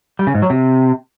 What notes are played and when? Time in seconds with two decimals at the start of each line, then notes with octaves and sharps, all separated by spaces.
0.19 G3
0.27 C#3
0.35 G#2
0.42 F#3
0.50 C3